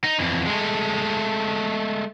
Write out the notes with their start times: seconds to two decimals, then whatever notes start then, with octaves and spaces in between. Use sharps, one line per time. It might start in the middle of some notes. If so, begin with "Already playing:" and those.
0.04 D#4
0.20 F2 E3
0.46 G#3 A3